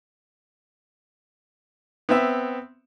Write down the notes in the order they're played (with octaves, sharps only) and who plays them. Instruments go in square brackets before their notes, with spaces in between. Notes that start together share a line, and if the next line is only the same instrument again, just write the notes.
[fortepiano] B3 C4 E5